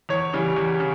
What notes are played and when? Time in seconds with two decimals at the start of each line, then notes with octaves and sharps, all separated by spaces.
0.09 E2 C#5
0.33 C#3 E3 G3
0.57 E2
0.80 C#3